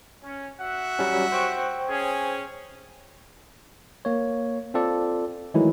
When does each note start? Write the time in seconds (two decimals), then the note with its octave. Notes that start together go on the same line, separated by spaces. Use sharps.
0.24 C#4
0.60 F#4 E5 F#5
0.99 F#3 G3 C#4
1.32 C5 G5 C#6
1.89 C#4 G#4
4.05 A#3 C#5
4.74 C4 F4 A4 D5
5.54 D#3 E3 F#3 G#3 A3 E4